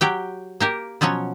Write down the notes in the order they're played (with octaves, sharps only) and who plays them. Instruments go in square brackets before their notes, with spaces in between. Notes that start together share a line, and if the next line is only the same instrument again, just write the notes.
[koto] F#3 G4 G5
A#3 G4 A#4
B2 F3 F#3 C#4 C#5